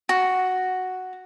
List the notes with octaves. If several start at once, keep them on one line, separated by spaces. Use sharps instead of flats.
F#4